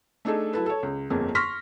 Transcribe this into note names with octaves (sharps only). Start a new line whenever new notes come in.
A3 D4 D#4 G#4 A4
F#3 E4 A4 B4
A4 C#5
C#2
G1 F2 A#3 G#4
C6 C#6 F6 A#6 B6